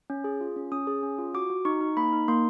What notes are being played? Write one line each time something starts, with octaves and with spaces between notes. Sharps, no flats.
C#4
G#4
F4
C#4
C#4 D#6
G#4
C#4
F4
F#4 D6
F#4
D#4 C#6
D#4
A#3 B5
D#4
A#3 C6